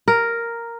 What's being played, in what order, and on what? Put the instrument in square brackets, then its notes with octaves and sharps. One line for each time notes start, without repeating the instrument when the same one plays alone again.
[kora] A#4